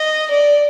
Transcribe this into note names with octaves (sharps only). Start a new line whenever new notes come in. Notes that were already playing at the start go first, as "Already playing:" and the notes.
Already playing: D#5
D5